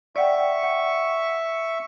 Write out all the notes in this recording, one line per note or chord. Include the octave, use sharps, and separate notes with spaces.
D5 E5 F#5 G5 C#6
F#5